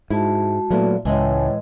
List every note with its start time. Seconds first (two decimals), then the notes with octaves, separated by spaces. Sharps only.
0.10 G#2 G#3 E4 F#4 A5
0.70 A#2 F#3 A3 B3 E4
1.05 C#2 A2 E3 G#3 D#5 E5 G#5 A5